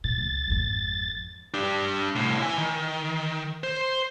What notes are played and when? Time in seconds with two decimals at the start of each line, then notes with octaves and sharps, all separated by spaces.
0.04 A#2 A6
0.18 C#2
0.48 G#1 F2
1.54 D4 G4
2.15 C2 A2
2.39 E4 G#5
2.58 D#3
3.64 C5